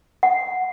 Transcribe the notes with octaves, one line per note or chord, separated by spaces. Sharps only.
F#5